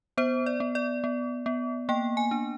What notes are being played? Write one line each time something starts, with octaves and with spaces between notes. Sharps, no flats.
B3 C5
D5
B3
D5
B3
B3
A#3 G5
G#5
D4